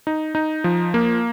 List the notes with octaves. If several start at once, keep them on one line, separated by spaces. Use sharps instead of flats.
D#4
D#4
F3
A#3